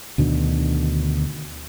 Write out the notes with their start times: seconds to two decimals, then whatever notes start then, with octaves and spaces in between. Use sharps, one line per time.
0.18 D2 B2 D3 D#3